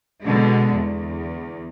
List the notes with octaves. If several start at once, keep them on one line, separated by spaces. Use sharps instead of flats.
B2 D3 G#3
E2